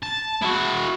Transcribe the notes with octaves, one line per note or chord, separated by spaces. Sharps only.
A5
E4 F#4